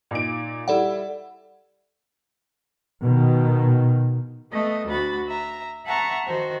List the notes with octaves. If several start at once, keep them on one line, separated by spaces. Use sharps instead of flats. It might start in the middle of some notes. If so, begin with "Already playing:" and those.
A#2 D#4 D7
G3 E4 A4 D5 F#5
B2 D#3
A3 B3 A4 D#5
D2 F#4 B5 A6
E5 A#5
E5 F#5 A5 A#5 C#6
D#3 F#4 C5